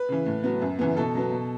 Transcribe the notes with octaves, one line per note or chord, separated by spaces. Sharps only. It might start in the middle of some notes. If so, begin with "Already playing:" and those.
Already playing: B4
C#3 E3
A2
F#3 B3
F#2
C#3 E3 B3
B2 A4
F#3 B3
B2